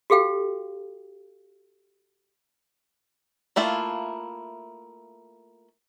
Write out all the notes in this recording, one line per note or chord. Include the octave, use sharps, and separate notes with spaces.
F#4 G4 A4 F5 G5
A3 A#3 E4 F4